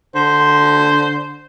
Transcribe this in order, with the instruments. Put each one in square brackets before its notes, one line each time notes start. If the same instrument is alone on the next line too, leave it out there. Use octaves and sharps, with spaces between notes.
[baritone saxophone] D3 [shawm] C5